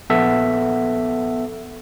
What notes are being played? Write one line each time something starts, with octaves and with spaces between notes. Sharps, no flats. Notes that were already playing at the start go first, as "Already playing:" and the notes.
A#1 B3 A4 E5 F#5